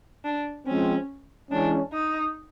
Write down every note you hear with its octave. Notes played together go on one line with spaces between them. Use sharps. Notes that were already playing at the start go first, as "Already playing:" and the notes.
D4
F3 G#3 C4 C#4
E3 G#3 C#4 D4
D#4